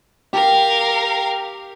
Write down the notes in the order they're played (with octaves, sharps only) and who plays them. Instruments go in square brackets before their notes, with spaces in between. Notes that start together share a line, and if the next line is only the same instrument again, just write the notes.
[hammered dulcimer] G4 [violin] A#4 F5